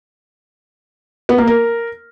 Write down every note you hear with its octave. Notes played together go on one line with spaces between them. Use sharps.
B3
A#3
A#4